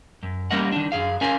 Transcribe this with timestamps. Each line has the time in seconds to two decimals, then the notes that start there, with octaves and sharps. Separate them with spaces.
0.23 F#2
0.51 G3 A#3 C#4 A#4 D#5 F#5
0.72 D#3 D4
0.92 F#2 G#4 F5
1.21 C#4 A#4 D#5 F5 G#5